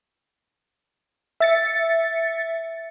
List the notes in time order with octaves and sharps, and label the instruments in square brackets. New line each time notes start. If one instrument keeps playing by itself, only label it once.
[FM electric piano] E5 A6 C#7